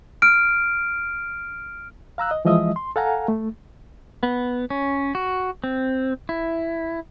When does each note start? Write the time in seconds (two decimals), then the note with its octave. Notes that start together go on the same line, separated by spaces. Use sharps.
0.22 F6 D7
2.18 F5 A#5 E6 F#6
2.31 D#5
2.45 E3 F3 G#3 D#5 E5 D#6
2.76 C6
2.96 A4 F5 F#5 G#5 A#5
3.28 A3
4.23 B3
4.70 C#4
5.15 F#4
5.64 C4
6.29 E4